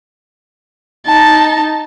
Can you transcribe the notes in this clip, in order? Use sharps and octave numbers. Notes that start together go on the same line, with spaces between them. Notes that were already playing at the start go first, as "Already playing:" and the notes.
D#4 A5